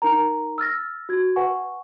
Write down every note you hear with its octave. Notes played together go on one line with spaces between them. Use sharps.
D#4 A#4 A#5
E6 F6 A6 A#6
F#4 G#6
B4 F#5 G#5 C#6